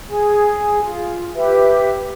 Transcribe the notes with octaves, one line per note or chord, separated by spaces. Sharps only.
G#4 G#5
F4
G4 B4 E5